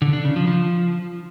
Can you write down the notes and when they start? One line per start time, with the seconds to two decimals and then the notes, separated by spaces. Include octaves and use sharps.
0.02 D3
0.13 D4
0.25 C#3
0.36 F3
0.47 F3